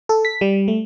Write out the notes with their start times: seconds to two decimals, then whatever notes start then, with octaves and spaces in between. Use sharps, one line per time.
0.09 A4
0.25 B6
0.41 G3
0.68 A3